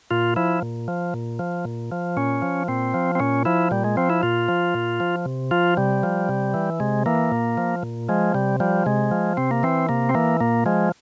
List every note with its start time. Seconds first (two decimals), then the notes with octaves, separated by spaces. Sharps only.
0.11 A#2 F4
0.36 F3 E4
0.62 A#2
0.88 F3
1.14 A#2
1.39 F3
1.65 A#2
1.92 F3
2.17 A#2 C#4
2.42 F3
2.68 A#2 C4
2.94 F3
3.15 C4
3.19 A#2 C#4
3.45 F3 E4
3.71 A#2 G3
3.84 G#3
3.97 F3 C4
4.10 E4
4.23 A#2 F4
4.48 F3
4.74 A#2
5.00 F3
5.25 C3
5.51 F3 F4
5.77 C3 G3
6.03 F3
6.29 C3
6.54 E3
6.80 C3 G#3
7.06 E3 A#3
7.32 A#2
7.57 F3
7.83 A#2
8.09 F3 G#3
8.34 C3 G3
8.60 F3 G3
8.86 C3 G#3
9.11 F3
9.37 C3 C4
9.51 A#3
9.63 E3 C4
9.89 C3 A#3
10.09 C4
10.15 E3 A#3
10.40 A#2 A#3
10.66 F3 G#3